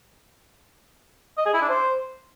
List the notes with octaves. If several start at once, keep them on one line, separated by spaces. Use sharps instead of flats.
D#5
G#4
E4
D4
C5